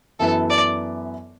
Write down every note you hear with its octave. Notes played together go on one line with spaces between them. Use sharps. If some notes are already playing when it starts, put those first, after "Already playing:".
F#2 E3 B3 E4 A4 B4
D5